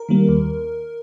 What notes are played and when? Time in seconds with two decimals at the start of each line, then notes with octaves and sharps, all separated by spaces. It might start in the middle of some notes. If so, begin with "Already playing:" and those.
Already playing: A#4
0.09 D#3 G3 A#3
0.29 D#2